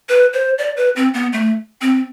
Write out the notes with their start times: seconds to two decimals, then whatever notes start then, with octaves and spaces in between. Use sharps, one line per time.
0.09 B4
0.33 C5
0.58 D5
0.77 B4
0.96 C4
1.14 B3
1.33 A3
1.81 C4